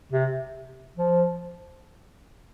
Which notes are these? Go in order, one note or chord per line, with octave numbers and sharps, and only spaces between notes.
C3
F3